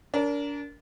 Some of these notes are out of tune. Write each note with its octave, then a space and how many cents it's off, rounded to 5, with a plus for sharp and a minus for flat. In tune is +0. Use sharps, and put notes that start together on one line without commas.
D4 -35 A#4 +0